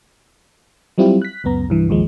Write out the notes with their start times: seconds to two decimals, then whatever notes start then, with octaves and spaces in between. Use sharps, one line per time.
0.98 F#3 G3 C4 E4 F4 G4
1.22 F#6 B6
1.44 C#2 F#2 B3 A#5
1.69 C2 G2 E3
1.89 A1 D#2 F3 G#3